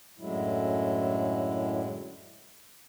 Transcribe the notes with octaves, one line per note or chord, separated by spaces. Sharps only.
F#2 A2 D3 F#3 G#3 E4